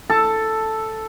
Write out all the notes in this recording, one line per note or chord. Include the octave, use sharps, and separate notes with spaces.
A4